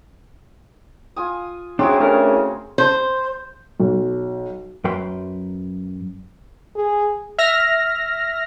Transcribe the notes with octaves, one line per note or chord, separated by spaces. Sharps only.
F4 G#5 D#6
C#3 C4 D4 E4 F#4 G#4
A3 C#4 A#4
C5
B1
F#2 B4 G5 C6
G#4
E5 F6 A#6